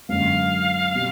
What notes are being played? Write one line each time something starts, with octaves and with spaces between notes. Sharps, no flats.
G#1 F#2 D3 F#3 A#3 F5
B2 G3